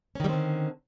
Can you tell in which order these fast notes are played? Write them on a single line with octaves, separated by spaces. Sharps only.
C#4 D#3 G3 C4 D3